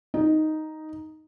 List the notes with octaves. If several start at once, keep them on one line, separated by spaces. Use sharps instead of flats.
D#4